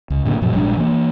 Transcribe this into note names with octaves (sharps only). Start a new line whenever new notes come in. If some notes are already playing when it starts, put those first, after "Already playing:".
C#2
A2 D3 G3 A#3
F#2 A#2 F3 F#3
A#1 G#2 G3 D4
E3 A#3